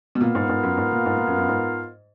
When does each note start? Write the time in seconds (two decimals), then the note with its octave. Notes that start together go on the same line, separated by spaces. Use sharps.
0.15 B2
0.21 A#2 B3 F4 A#4 F5
0.35 G#2
0.49 G#2
0.63 F#2
0.77 G#2
0.92 A#2
1.06 G#2
1.17 A#2
1.27 F#2
1.38 F#2
1.48 G#2